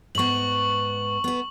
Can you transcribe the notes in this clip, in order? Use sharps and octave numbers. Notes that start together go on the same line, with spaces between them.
G#2 B3 C#6 F#7
B3 B4